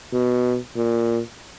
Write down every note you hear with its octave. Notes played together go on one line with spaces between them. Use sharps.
B2
A#2